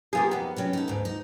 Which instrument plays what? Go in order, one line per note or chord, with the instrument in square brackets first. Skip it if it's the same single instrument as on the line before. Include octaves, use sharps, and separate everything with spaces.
[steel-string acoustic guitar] F#3 B3 G4 [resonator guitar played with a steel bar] A#3 F4 G#4
[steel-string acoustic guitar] F2 D#3 [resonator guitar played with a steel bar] B3
[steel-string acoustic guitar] C3 F#3 C#4
D#4 A4
D2 G#2
D#4